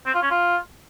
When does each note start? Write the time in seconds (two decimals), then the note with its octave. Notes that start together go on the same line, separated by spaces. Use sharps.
0.06 C4
0.14 F4
0.22 C#4
0.31 F4